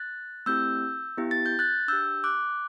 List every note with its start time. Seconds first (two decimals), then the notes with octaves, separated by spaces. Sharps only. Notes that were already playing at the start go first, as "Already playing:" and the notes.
Already playing: F#6 A6
0.46 A3 C4 E4 G4 E6 G6
1.17 B3 E4 G4
1.31 A6
1.46 G6
1.59 F#6 A6
1.88 D4 G4 E6 G6
2.24 D6 F#6